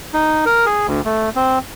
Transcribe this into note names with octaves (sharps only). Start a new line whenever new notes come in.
D#4
A#4
G#4
D2
A3
C4